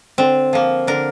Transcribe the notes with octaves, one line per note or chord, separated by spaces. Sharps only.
D3 C4
F3 A#3
D3 A#4